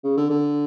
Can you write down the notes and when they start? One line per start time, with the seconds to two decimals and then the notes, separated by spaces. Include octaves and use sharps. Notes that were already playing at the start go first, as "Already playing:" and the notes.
0.04 C#3
0.17 D3
0.30 D3